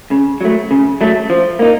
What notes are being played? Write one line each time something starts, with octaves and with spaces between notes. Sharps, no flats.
C#3
F#3 A3
C#3
F#3 A3
F3
A#3 D#4